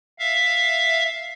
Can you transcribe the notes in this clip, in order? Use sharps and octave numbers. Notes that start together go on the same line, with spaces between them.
E5 F5